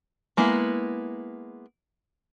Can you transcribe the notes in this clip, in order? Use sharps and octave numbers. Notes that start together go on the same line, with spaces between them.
G#3 A#3 B3 E4